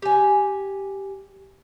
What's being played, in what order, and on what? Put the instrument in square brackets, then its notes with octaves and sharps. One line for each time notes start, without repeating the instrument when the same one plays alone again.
[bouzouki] G4 G#5